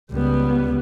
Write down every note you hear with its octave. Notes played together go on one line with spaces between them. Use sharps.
C#2 G3 B3